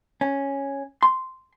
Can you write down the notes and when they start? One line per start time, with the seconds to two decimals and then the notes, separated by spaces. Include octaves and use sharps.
0.21 C#4
1.03 C6